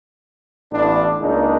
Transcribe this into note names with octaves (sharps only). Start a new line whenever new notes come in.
A1 A2 B3 D4
C#2 G#3 A#3 D4 D#4